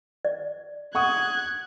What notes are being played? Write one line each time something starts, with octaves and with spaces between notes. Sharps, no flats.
D5
F#5 C#6 D#6 F#6 G#6